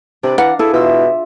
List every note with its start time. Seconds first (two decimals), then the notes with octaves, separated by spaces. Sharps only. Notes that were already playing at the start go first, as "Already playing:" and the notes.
0.23 C3 D4 B4 D5
0.38 E3 F5 F#5 A#5
0.59 E4 G#4 A4
0.74 B2 F4 E5 E6